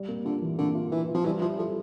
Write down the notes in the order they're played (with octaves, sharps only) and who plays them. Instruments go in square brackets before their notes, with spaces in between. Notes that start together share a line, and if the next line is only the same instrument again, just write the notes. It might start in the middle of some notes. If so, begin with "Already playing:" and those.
Already playing: [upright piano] G3
A#3
[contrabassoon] D3 [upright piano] F4
[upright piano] E3
[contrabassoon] D3 [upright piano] A#3
[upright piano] F4
[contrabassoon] E3 [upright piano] F4
[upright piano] F4
[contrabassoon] F3
[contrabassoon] E3 [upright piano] G3
[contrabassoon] F3 [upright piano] E4
[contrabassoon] F3 [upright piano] A4